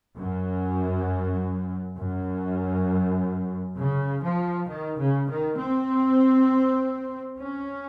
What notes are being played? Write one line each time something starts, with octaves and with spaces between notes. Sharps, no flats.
F#2
F#2
C#3
F3
D#3
C#3
D#3
C4
C#4